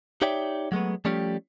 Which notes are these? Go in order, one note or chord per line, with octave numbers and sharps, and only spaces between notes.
D#4 G4 C#5 D5 E5 G5
F#3 G#3 A3 B3
F3 G3 A3 C#4 G4